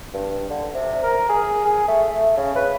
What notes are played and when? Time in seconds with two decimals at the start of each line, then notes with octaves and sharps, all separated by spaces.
0.14 G2
0.50 D3
0.74 C3
1.03 A#4
1.29 G#4
1.65 G#4
1.88 A3
2.10 A3
2.37 C#3
2.56 B4